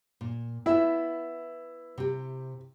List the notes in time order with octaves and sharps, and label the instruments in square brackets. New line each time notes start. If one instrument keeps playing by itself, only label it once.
[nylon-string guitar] A#2
[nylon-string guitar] B3 E5 [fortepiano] E4
[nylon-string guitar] C3 G4